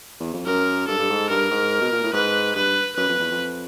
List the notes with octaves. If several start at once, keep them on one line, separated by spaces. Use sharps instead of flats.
E2
F2
F#2 A#4
G2 A4
G2
G#2
G2 A#4
G#2
B2
A#2
A2
G#2 B4
G2 B4
F#2 B4
F2
E2
F2